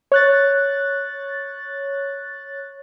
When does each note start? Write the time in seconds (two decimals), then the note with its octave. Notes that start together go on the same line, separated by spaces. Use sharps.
0.12 C#5 F#6 A6